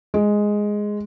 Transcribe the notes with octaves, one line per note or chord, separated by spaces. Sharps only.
G#3